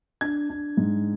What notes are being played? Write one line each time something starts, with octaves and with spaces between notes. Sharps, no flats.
D4 G#6
D4
G#2